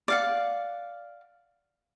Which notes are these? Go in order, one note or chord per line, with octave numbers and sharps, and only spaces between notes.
D5 F5 F#5